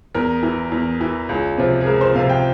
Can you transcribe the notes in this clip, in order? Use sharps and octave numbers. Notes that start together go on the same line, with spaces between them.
E2 A#4
E3
E2
E3
C#2
C3 F3
G#4
C#2 A#4
C5
C3 F3 F5
G5